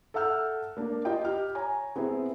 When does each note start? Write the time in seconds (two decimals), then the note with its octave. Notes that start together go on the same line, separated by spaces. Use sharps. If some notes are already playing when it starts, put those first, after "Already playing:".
0.14 A4 E5 F#5 E6 F6 G6
0.77 A#3 D4
1.05 F4 D#5 G5
1.24 G4 F6
1.55 C#5 G#5 A#5
1.96 B3 C4 E4 G#4